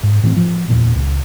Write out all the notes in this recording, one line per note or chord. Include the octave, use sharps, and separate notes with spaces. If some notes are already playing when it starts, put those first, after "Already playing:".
G#2
A2 E3 C4
F3
D1 E2 A#2
C#2